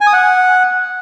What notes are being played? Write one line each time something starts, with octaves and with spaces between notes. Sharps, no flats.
G#5
D#6
F#5